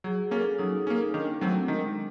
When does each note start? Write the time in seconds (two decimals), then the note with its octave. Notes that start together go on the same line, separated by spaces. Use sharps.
0.04 F#3 G#4
0.31 A#3 C#4 A4
0.59 F#3 D#4
0.87 A#3 C#4 D#4
1.14 D#3 D4
1.41 F#3 A3 C4
1.68 D#3 G#3